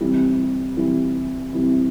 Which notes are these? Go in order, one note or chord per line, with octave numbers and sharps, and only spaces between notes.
C3 E3 G3
C3 E3 G3
C3 E3 G3